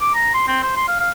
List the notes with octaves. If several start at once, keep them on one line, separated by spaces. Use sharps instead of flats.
D6
A#5
C6
C4
C5
C6
F5
F5